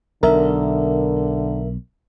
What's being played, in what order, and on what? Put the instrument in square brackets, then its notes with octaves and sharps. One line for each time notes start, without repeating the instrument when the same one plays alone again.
[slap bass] B1 [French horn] D3 [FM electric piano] A#4 E5